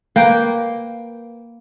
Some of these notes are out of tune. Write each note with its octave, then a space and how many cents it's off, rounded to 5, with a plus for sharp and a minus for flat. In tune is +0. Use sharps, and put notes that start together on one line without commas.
A#3 +0 B4 +0 G5 +0